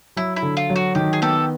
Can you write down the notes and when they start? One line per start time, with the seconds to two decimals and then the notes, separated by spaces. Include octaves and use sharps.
0.16 F#3 E4
0.36 E4
0.42 D3
0.57 F4
0.70 F#3
0.76 F#4
0.95 D#3 G4
1.13 G#4
1.22 B3 G4 A4